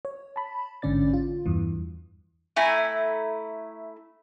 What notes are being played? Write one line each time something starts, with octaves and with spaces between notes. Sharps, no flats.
C#5
A5 B5
A1 G#2 D3 C#4 D5 A6
F4
E2 G2 E3
A3 E4 G#5 A#5